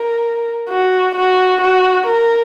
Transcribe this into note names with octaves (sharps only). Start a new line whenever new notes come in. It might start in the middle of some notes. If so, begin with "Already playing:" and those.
Already playing: A#4
F#4
F#4
F#4
A#4